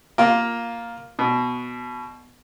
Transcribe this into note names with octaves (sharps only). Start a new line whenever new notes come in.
A#3 F4
B2